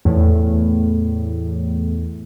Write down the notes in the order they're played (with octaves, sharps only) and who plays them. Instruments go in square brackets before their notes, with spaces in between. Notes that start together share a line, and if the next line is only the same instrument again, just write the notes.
[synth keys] E2 A2